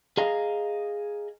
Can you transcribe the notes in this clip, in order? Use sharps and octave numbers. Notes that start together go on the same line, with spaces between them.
G#4 D#5 F5 A#5